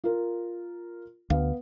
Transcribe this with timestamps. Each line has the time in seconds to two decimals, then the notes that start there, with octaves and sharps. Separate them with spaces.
0.04 F4 A#4
1.30 D2 B3 F5